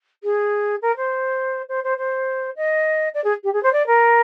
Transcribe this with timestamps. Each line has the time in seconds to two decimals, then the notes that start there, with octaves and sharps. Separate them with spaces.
0.23 G#4
0.82 A#4
0.96 C5
1.69 C5
1.84 C5
1.98 C5
2.56 D#5
3.14 D5
3.24 G#4
3.43 G4
3.53 G#4
3.63 C5
3.72 D5
3.87 A#4